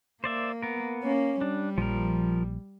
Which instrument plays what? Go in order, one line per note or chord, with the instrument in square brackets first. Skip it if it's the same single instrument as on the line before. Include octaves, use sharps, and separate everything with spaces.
[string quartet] A#3 [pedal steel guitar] C5 D5 E5
[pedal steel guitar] B3 A#4
[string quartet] A#3 C#4
[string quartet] G3 [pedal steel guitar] D4
[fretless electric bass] A#1 [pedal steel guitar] F3 A#4